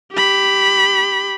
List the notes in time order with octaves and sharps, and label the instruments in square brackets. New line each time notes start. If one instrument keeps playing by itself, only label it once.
[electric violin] G4 B5